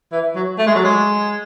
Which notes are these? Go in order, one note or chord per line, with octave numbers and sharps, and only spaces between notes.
E3
F#3
A3
G#3
F#3
G#3